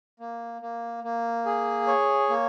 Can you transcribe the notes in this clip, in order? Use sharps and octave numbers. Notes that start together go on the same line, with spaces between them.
A#3
A#3
A#3
G#4
C#5
A#3